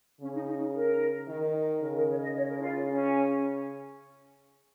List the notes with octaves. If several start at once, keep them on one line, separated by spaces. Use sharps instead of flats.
C#3 C#4
D#4
D#4
A#4
D#3
C#3 A#4
A#4
C#5
D#5
C#5
A#4
D#4
F4
C#4